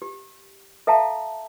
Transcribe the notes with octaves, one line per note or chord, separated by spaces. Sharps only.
G4
A4 E5 F5 G5 A5 A#5